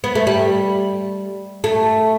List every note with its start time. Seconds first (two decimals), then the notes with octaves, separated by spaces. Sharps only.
0.04 B3
0.15 A3
0.27 G3
1.64 A3